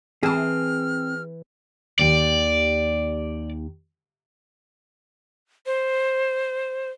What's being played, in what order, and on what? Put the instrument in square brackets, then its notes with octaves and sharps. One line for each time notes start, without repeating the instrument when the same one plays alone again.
[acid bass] E3 [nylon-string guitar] C4 A5 [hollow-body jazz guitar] G#4 [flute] F6
[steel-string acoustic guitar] D#2 G4 [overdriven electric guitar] D5
[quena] C5